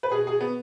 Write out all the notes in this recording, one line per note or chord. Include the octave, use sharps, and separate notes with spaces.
B4
B2 G#4
G#4
B3